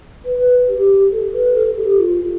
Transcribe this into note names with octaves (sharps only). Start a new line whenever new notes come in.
B4
G4
A4
B4
A4
G4
F4